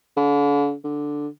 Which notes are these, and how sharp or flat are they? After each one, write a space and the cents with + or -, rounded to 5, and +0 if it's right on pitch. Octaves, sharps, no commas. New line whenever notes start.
D3 -40
D3 +0